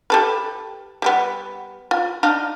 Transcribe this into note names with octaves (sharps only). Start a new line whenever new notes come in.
G4 A4 B4
G3 A3 B3
F4
D4 D#4 F5